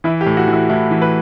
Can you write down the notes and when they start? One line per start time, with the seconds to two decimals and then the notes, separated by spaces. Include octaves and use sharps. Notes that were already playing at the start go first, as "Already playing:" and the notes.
0.04 E3 E4
0.21 G4
0.26 A2
0.37 F#4
0.48 E3
0.53 E4
0.70 A2 E4
0.91 E3
1.02 B4